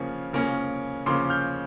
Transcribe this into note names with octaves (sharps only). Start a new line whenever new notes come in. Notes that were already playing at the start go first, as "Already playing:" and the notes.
Already playing: C#3 F3 A#3 C#4
C#3 F3 A#3 C#4
C#3 F3 A#3 C#4 C6 D6
F6 G6